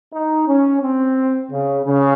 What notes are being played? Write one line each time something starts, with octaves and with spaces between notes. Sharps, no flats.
D#4
C#4
C4
C#3
C#3